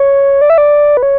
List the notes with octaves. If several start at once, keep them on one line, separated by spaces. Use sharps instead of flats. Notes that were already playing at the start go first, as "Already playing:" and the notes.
Already playing: C#5
D5
E5
D5
B4
C#5